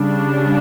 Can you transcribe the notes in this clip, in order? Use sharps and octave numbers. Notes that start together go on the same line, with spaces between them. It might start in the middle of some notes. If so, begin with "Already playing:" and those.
Already playing: C#3 G3 D4